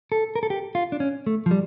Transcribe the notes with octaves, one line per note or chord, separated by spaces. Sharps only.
A4
A#4
A4
G4
F4
D4
C#4
A3
F3
G3